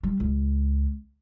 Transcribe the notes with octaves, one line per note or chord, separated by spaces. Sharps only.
G3
C#2